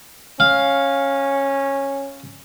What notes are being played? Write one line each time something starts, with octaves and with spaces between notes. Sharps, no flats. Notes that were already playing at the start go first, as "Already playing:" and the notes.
C#4 F5